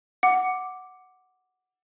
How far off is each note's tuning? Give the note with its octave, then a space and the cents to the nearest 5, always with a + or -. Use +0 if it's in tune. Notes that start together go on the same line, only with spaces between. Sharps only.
F#5 +0 D6 +0